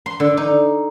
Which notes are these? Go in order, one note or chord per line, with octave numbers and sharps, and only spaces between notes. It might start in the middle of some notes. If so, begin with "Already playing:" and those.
C6
D3
D#4